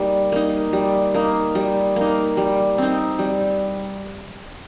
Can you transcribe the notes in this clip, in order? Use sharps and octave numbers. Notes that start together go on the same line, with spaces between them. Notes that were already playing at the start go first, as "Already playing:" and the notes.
Already playing: G3 A#3 D#4
A#3 D#4
G3
A#3 D#4
G3
A#3 D#4
G3
C4 D#4
G3